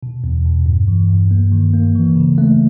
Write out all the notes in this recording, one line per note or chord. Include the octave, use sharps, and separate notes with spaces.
B2
E2
B2
G2
E3
G2
A#3
D#3
A#3
E3
C#3
A3